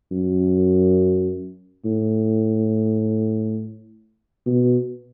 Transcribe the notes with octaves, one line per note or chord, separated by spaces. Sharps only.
F#2
A2
B2